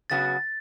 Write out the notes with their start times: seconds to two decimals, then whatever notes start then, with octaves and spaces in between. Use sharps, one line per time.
0.10 C#3 F#3 B3 F#4 A6